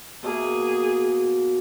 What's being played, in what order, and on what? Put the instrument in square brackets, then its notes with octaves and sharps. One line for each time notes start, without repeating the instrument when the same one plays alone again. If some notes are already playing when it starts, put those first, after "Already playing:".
[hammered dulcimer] B2 A#3 [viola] G#4